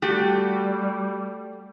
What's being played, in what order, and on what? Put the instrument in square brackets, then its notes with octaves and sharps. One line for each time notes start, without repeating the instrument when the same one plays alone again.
[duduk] G3 [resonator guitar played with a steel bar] A3 F#4 G4